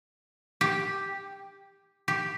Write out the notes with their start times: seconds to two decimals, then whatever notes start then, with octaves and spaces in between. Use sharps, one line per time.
0.61 G4
2.08 G4